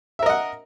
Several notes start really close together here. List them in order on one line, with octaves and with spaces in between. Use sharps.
E5 A#4 D#5 F#5